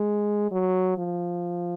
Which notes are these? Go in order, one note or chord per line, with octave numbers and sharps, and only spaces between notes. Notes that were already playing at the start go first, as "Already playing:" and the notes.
Already playing: G#3
F#3
F3